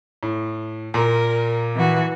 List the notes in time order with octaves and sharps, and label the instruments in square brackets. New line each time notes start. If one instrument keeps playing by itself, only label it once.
[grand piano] A2
[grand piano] A#2 [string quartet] A#4
[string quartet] E3 F#4